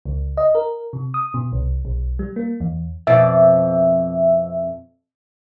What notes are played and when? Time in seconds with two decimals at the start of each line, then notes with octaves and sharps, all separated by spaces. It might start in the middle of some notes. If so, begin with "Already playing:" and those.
0.05 C#2
0.37 D#5
0.55 A#4
0.93 C3
1.14 D#6
1.34 B2
1.52 C2
1.85 B1
2.19 G3
2.36 A#3
2.60 E2
3.07 F2 B2 D5 E5